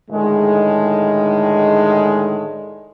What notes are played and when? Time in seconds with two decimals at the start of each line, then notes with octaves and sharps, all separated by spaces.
0.10 A2 D3 D#3 G#3